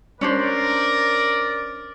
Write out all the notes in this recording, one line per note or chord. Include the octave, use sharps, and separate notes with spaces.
C#4 D4 A#4 C5 D5